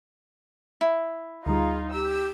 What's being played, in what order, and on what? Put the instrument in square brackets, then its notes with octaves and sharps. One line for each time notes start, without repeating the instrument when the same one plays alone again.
[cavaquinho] E4
[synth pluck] D2 G3 [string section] D#4 F4 [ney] G#4
[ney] G4 [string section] E6